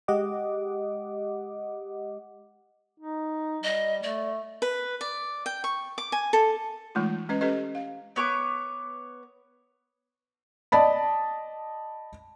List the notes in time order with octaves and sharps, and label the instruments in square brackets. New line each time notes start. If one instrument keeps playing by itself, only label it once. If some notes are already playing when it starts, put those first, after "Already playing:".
[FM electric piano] G#3 G4 D#5 F#5 D6
[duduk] D#4
[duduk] G3 [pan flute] D#5
[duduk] A3 [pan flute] D5
[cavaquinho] B4
D5
G5
C#6
D6
G#5
A4
[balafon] E3 G#3 A3 D#4 F4
G#3 C#4 B4 D#5
C#4 G4 A4 B4 D#5
F5
[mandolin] B3 C#5 G5 D6
[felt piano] D5 D#5 A5 B5